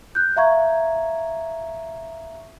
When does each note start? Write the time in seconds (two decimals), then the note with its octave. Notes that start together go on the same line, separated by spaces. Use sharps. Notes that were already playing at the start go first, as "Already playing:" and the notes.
0.15 F#6 G6
0.36 E5 F5 A#5 C#6 G#6